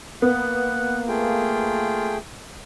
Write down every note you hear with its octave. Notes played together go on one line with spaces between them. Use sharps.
A#3 B3 F#5
A3 F4 G#4 G5